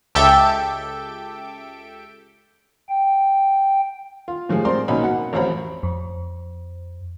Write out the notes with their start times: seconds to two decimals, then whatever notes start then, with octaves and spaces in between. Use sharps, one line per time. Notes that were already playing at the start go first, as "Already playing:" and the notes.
0.15 C#2 G4 A4 E5 G5 D7
2.89 G5
4.28 F4
4.49 A2 F3 G3 G#3
4.65 C4 A#4 C5 D5 C6
4.88 B1 A#3 C#4 D#4 B5
5.02 B2 F#5
5.33 A1 F2 C5 C#5 A#5 B5
5.83 F2